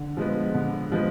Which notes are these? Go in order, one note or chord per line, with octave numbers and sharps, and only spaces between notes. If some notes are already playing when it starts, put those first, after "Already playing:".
Already playing: D3
F3 G#3 B3
D3
F3 G#3 B3